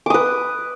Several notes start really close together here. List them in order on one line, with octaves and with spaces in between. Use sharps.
D6 D#6 B4